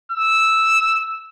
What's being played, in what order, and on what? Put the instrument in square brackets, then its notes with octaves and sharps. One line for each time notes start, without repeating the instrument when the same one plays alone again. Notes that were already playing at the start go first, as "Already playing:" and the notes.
[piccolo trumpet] E6